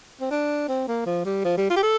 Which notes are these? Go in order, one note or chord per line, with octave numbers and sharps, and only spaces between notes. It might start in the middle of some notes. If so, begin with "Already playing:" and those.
C4
D4
C4
A#3
F3
G3
F3
G3
F4
G4
A4